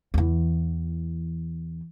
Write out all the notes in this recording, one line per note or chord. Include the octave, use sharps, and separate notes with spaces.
E2 E3